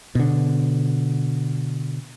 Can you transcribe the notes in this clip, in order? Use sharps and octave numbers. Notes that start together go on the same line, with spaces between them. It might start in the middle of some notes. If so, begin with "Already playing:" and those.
B2 D3